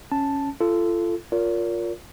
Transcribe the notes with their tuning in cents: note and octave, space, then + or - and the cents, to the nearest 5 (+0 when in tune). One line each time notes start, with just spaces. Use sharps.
C#4 +0 A5 +0
F4 -30 A4 +0
F4 +10 A#4 +0 C#5 +45